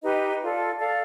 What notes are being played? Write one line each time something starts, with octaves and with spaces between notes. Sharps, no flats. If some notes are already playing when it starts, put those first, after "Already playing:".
D#4 G4 B4 D#5
F4 A4 D5
A4 D5 F5